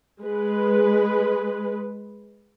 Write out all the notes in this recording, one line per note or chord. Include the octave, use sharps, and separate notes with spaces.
G#3 B4